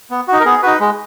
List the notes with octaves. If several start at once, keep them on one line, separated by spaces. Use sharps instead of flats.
B3
D#4 F#4
A#4
B3 G#4
D#4 F#4 B4
G#3